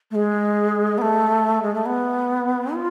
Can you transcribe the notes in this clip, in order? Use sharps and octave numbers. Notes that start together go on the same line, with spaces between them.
A3
G#3
B3
A3
G#3
A3
B3
F4